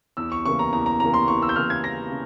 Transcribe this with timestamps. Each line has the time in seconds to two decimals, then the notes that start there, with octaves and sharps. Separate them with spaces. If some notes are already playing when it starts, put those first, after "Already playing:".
0.17 E2 E6
0.32 C#6
0.46 C#3 E3 A#3 C#6
0.59 A#5
0.73 E2 A#5
0.86 A#5
1.00 C#3 E3 A#3 A#5
1.14 C6
1.28 E2 C#6
1.42 E6
1.49 G6
1.56 C#3 E3 A#3 F6
1.70 G#6
1.83 E2 A#6
2.10 C#3